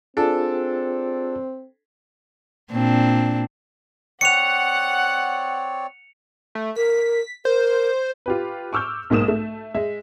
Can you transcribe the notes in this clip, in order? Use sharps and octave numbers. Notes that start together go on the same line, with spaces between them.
C4 D4 F4 G#4 A4
A#2 C4 D4
C4 C#5 D5 F#5 C#7 F7
A3
A#4 B6
A#4 C5
F4 G4 B4
C#6 D6 E6 F6 G6
B1 G#2 A#3 D#6 E7
A3
G#3 E5